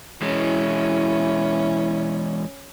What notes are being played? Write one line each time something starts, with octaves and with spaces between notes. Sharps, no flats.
E3 G#3 C#4 E4